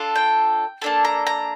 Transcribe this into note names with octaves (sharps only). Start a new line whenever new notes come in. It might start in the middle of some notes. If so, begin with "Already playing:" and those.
Already playing: D4 F4 A4
G5
A#3 D4 A4 A5
A#5
A#5